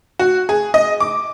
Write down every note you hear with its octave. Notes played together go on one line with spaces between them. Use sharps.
F#4
G#4
D#5
D6